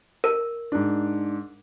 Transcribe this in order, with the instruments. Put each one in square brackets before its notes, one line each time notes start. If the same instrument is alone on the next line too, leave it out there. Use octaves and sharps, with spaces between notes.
[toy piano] A#4
[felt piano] G#2 D4